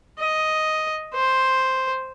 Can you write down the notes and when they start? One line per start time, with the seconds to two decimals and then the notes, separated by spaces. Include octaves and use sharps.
0.19 D#5
1.14 C5